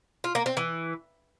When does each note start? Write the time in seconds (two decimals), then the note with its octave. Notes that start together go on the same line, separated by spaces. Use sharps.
0.24 F4
0.35 A#3
0.46 C4
0.57 E3